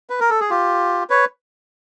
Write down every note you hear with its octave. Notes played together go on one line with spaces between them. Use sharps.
B4
A#4
A4
G#4
F4 G4
B4 C#5